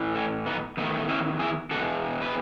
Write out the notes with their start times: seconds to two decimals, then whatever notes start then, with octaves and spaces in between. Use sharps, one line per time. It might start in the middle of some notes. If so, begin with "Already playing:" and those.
Already playing: A2 E3
0.15 A3 C#4
0.46 B3 D#4
0.77 E2 D#3 A3 B3 D#4
1.09 C#4 E4
1.39 E4 G#4
1.71 E2 B2 G#3 F#4 A4
2.22 B4